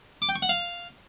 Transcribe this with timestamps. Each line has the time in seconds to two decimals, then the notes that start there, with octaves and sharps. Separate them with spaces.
0.22 D6
0.29 G5
0.36 C#6
0.42 F#5
0.49 F5